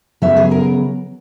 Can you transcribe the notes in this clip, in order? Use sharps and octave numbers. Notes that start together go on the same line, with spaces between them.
C#3 F#3 B3 E5
G#4
A#4